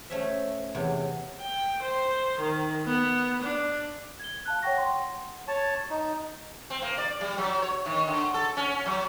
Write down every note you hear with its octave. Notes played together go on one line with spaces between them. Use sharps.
A3 C#4 C5 E5
E2 C3 C#5
G5
C5
D#3
B3
D4
G#6 G7
F5 A5 F#6
C#5 F#5 G5 C#6 A#6
F#5 C6
C#5 A5
D#4
C4
A#3
D5
G3
F#3
C#5
D#3
D3
A4
C#4
F#3